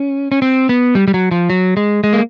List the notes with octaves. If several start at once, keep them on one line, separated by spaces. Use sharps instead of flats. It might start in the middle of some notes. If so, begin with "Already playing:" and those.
Already playing: C#4
C#4
C4
B3
G3
G3
F#3
F3
F#3
G#3
G#3
A#3